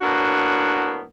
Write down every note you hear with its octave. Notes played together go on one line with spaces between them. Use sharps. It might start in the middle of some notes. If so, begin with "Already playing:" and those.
A2 F#3 A#3 B3 D4 F#4